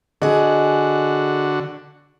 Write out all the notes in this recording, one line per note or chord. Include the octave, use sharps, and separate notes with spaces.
D3 F#4 G#4 D#5